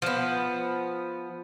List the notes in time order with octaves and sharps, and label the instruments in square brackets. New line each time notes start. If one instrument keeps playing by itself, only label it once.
[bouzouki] F3 B3